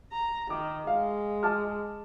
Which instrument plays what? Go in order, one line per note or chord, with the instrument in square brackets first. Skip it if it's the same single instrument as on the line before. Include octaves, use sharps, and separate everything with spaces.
[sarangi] A#5
[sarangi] D#3 [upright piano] D6
[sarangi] G#3 [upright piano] F5
[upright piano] A5 D6 F6